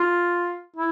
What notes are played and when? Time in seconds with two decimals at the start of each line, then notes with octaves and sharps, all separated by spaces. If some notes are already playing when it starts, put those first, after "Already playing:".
Already playing: F4
0.76 E4